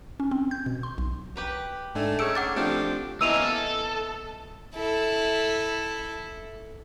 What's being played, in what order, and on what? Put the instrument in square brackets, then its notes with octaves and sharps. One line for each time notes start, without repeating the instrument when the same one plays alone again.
[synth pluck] C#4
C4
G6
B2
C6
B1
[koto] G4 B4 A#5
[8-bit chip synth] G#2 D4 G#5 [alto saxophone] A3
[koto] C#4 D#4 [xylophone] G#4 E6 D7 [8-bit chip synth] C#7
[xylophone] F#5 D6 A6
[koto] F3 D4 [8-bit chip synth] A3 C4 F4 [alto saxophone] G4
[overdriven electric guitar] A#3 C#4 [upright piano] B3 E4 D#5 [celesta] E6 D#7 F7
[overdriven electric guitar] A4
[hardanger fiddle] E4 A4